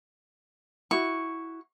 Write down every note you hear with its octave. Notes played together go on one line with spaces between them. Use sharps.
E4 F#4 C#6